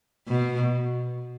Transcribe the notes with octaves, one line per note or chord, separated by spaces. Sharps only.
B2